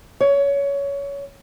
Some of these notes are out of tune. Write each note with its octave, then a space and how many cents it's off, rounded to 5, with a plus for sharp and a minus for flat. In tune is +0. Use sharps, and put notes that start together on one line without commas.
C#5 +20